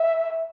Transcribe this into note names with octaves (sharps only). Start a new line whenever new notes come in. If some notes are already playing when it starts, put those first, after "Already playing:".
Already playing: E5